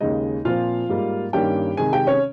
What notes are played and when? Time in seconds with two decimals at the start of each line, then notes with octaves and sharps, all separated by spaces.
0.01 D#2 C#3 G#3 D#4 D#5
0.45 A#2 F3 C4 F4 F5
0.89 G#2 G3 A#3
1.33 G2 D#3 A#3 C#4 G4 G5
1.77 C3 D#3 G#3 G#4 G#5
1.93 G4 G5
2.07 C#4 C#5